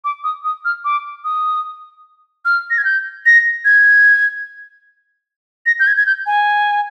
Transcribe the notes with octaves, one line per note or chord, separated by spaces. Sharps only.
D6
D#6
D#6
F6
D6
D#6
F6
A#6
G#6
G6
A#6
G#6
A#6
G6
G#6
G#6
G6
G#5